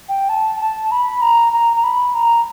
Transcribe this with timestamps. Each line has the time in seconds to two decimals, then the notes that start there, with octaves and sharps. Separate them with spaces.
0.09 G5
0.29 A5
0.60 A5
0.92 B5
1.22 A#5
1.53 A#5
1.76 A#5
1.84 B5
2.15 A#5